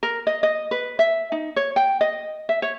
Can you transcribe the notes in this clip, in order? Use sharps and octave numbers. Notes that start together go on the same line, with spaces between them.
A#4
D#5
D#5
B4
E5
D#4
C#5
G5
D#5
E5
C#5